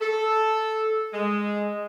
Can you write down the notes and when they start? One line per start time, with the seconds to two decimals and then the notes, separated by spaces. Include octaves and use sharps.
0.02 A4
1.13 G#3